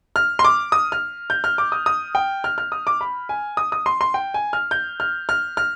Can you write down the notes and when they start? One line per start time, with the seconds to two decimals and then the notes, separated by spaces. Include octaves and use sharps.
0.16 F6
0.39 C6
0.44 D6
0.72 D#6
0.92 F6
1.30 G6
1.44 F6
1.58 D6
1.72 D#6
1.86 D#6
2.15 G5
2.44 F6
2.58 F6
2.72 D#6
2.87 D6
3.01 B5
3.29 G#5
3.57 D#6
3.72 D#6
3.86 C6
4.01 C6
4.14 G5
4.34 G#5
4.53 F6
4.71 G6
5.00 F6
5.29 F6
5.57 F6